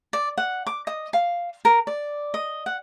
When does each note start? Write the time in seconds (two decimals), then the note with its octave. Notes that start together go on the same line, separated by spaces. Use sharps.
0.13 D5
0.38 F#5
0.67 D6
0.87 D#5
1.13 F5
1.65 A#4
1.87 D5
2.34 D#5
2.66 F#5